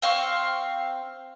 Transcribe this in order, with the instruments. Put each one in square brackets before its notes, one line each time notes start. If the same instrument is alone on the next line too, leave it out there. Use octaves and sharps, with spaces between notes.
[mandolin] C4 F5 G5 C#6